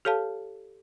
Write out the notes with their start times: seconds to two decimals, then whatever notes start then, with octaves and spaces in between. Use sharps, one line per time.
0.05 G4 A4 C#5 F5 A5